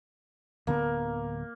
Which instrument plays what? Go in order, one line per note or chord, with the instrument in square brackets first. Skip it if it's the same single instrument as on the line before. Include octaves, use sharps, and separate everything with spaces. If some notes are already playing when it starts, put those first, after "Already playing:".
[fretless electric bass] D1 D3 B3 [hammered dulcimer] A#3